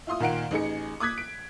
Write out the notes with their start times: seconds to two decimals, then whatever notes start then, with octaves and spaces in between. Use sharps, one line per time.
0.07 E4 F4 C6 D#6
0.20 A#2 D#3 A#4 F5 F#5 D7
0.51 A1 D#4 G#4 C#7
1.00 D6 D#6 F#6 G#6 B6
1.18 D7